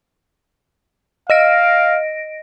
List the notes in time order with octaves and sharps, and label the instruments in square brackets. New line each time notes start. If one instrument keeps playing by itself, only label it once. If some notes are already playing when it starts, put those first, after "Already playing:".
[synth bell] D#5 A#6 D7 [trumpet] F5